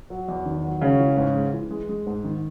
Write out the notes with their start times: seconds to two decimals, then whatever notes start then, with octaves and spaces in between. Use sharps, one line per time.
0.10 F#3
0.28 E2
0.45 D#3
0.64 F#3
0.81 C#3 G#3 C#4
0.99 E3
1.17 G#2
1.35 G#3
1.53 E3
1.71 G#3
1.89 G#3
2.07 G#2
2.24 D#3